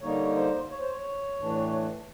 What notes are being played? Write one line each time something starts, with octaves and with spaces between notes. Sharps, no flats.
D3 G3 A#3 D#4 C#5
C5
C#5
C5
C#5
A2 E3 A3 D4